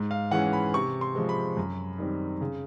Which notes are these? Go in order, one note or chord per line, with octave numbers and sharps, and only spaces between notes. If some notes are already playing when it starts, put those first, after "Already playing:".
Already playing: G#2
F5
E3 G#3 C#4 F#5
B5
C3 C#6
C6
F3 G#3 C4
B5
F#2
D#3 G3 C4
C#3